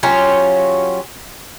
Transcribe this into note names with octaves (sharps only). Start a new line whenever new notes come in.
F#3 C#4 F4 G4